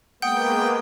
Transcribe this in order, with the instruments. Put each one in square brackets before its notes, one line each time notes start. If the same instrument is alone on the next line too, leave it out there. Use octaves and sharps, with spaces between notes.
[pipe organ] G#3 A#3 B3 [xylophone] F#5 [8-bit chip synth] G5 [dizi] D#6